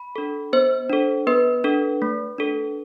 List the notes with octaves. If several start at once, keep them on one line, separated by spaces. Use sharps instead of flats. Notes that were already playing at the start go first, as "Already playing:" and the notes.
Already playing: B5
D4 A4
B3 C5
D4 A4
B3 B4
D4 A4
A3
D4 A4